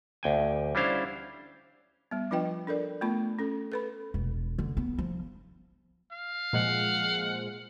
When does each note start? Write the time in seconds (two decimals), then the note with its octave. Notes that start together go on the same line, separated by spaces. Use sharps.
0.23 D2 G5 G#5
0.75 G3 C#4 D4 E4 C5 F5
2.11 G3 B3
2.31 F3 D4 F4 B4 D#5 G5
2.67 D4 A4 A#4 D5
3.01 A3 B3 F4 B5
3.39 C#4 A4
3.72 A4 B4 B5
4.14 E1
4.58 D3
4.77 B3
4.98 F3
6.12 F5
6.53 A#2 F3 G#3 F#5